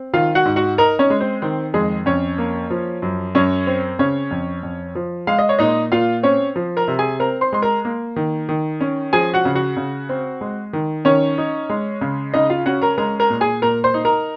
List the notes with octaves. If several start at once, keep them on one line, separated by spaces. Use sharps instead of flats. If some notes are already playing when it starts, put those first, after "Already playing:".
Already playing: C4
D#3 F4 F5
F#4 F#5
G#2
F#4 F#5
D#4 A#4 A#5
C#4 C#5
G#3
C4 C5
D#3 C4 C5
F2 G#3 G#4
F2 C#4 C#5
A#3
F3
F#2
F#2 C#4 C#5
C4
C#3 C#4 C#5
F2
F2
F3
G#3 F5
D#5
C#5
A#2 D#4 D#5
A#2 F4 F5
C4 C#4 C#5
F3
A#4 A#5
C3
G#4 G#5
C4 A#4 A#5
C5 C6
G#3 C6
A#4 A#5
A#3
D#3
D#3
C#4
F3 G#4 G#5
F#4 F#5
C#3
F#4 F#5
C#3
C4
G#3
D#3
D#3 C#4 C#5
D#4
G#3
C#3
C#3 D#4 D#5
F4 F5
C#4 F#4 F#5
A#4 A#5
G#3 A#4 A#5
A#4 A#5
A#2
G#4 G#5
A#2 A#4 A#5
C5 C6
D#4
A#4 A#5